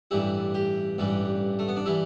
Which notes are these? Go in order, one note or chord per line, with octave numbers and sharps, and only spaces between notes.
A1 G2 E3 G3 E4
G4
A1 G2 E3 G3
A3
B3
D4
E3 G3 E4